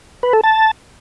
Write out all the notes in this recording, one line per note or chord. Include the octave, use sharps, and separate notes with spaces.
B4
A4
A5